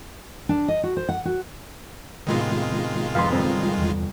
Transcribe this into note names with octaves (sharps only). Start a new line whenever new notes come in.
D4
D#5
F#4
C5
F#5
F#4
A2 C3 D#3 G#3 B3 F4
F2 A4 B4 F5 C6
G1 C4
E2